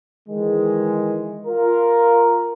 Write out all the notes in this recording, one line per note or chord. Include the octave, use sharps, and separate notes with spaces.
D#3 E3 G#3
F4 A#4